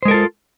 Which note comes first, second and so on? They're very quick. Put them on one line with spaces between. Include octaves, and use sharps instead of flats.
C5 G#3 A#4 A4 F4